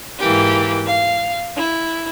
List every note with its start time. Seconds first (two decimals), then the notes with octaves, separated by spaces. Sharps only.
0.20 G#2 E3 A#3 G4
0.87 F5
1.56 E4